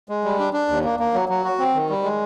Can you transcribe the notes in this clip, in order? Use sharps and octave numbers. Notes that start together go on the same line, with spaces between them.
G#3
G3
D4
D4
D#2
A#3
A#3
F#3
F#3
F#4
C4
D#3
G3
G#3